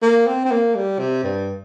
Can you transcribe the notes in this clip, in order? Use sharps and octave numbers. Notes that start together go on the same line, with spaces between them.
A#3
C4
C4
A#3
G3
C3
G2